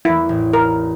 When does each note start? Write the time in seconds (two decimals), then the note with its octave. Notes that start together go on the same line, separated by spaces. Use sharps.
0.05 E2 A#3 E4
0.29 A1
0.53 A#4